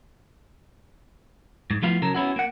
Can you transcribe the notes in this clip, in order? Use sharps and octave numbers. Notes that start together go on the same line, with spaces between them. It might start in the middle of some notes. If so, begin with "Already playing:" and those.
G#2
F3 A3 B3 E4 F4 F5
C#3 F#3 A4 A#4
B3 C#4 E4 F#4
A#3 F#5